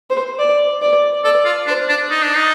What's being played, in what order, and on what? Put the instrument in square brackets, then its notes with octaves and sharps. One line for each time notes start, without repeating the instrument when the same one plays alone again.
[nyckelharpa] C5
D5
D5
[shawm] A4 [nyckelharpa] D5
[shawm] F4
[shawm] D4 [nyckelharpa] C5
[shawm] D4
D#4
D4
D#4